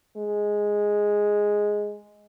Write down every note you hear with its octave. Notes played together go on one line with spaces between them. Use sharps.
G#3